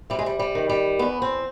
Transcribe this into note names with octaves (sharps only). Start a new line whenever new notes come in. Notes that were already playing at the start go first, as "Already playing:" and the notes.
C3 G3
G#3
G3
G3
D#3
G3
E2 B3
C4